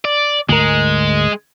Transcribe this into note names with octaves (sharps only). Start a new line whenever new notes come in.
D5
D2 G#2 G#3 A#4